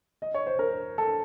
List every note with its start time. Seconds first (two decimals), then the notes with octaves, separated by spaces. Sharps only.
0.22 D#5
0.34 C#5
0.46 C5
0.59 A#4
0.98 A4